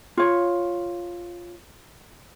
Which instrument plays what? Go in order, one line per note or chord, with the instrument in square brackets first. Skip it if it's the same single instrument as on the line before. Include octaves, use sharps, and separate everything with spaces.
[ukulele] F4 C#5